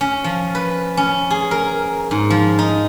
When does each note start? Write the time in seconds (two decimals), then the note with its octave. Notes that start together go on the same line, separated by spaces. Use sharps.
0.01 C#4
0.24 F3
0.55 B4
0.97 C#4
1.30 G#4
1.51 A#4
2.11 G#2
2.30 F3
2.59 D#4